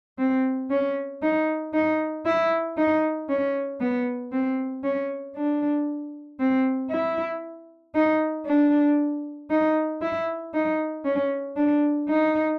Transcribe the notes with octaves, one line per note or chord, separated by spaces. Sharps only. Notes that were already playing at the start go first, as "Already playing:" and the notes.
C4
C#4
D#4
D#4
E4
D#4
C#4
B3
C4
C#4
D4
C4
E4
D#4
D4
D#4
E4
D#4
C#4
D4
D#4